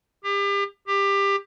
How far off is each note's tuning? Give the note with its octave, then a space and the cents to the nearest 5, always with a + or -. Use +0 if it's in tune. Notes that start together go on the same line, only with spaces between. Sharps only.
G4 +35
G4 +20